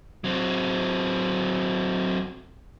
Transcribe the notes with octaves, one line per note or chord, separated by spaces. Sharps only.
F#3 C4